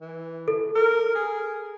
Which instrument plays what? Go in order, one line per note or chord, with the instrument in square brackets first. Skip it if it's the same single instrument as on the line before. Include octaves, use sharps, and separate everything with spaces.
[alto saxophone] E3
[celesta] A4
[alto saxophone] A#4
G#4